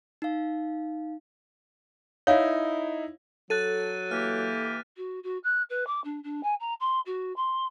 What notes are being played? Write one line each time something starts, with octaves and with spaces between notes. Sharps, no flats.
D#4 F5
D#4 E4 C#5 F5
F#3 A4 F#6 A6 D#7
E3 A#3 G4 F6
F#4
F#4
F#6
B4
D6
D4
D4
G#5
A#5
C6
F#4
C6